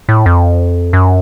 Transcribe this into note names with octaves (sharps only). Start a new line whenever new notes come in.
A2
F2
F#2